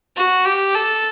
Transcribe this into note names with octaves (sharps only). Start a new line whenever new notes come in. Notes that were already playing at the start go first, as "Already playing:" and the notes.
F#4
G4
A4